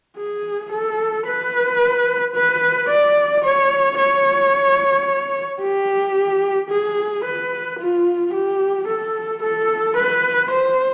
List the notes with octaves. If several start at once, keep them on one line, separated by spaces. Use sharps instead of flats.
G#4
A4
B4
B4
D5
C#5
C#5
G4
G#4
B4
F4
G4
A4
A4
B4
C5